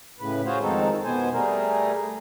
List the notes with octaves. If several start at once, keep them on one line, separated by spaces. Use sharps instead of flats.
A2 C#3 B4
F4 F#4 G#4 C5 C#5 F5
F2 D#3 G#3 C4 D#4 A4
B2 B3 C5 G#5
G3 A3 G#4 A#4